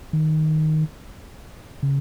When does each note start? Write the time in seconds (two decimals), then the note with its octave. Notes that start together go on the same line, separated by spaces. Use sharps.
0.13 D#3
1.83 C#3